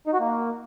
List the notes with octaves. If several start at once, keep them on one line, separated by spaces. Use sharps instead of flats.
D#4
F#4
A#3